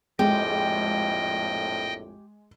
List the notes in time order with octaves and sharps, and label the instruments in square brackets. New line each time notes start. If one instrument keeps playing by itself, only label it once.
[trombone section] A#1 F2 A2 [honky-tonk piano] G#3 [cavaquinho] G4 [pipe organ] D#5 G5